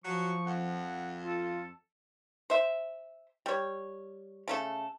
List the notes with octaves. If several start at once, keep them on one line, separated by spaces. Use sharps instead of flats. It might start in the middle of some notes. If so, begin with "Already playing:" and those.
F3 F#3 C#6
F2 F#5
F4 A4
C5 E5
G3 C#5
C#3 A3 A4